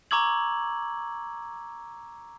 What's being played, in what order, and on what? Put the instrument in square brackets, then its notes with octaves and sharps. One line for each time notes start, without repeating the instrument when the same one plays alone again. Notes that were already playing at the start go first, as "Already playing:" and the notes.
[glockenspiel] A#5 C#6 D6 E6 G#6 F#7